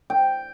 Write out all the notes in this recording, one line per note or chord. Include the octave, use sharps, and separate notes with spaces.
G5